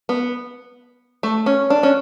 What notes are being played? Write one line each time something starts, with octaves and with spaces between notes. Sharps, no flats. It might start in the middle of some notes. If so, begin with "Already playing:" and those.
B3
A3
C#4
D4
C#4